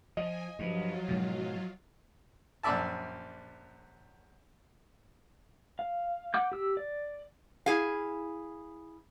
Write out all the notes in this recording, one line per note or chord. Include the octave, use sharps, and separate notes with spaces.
F3 D#5 G#5
G2 F3 F#3 F4 C7
G#2 B2
A#1 F#2 D5 E5 A5
F5
F#5 D6 G6
G4 E6
D5
E4 G#4 F5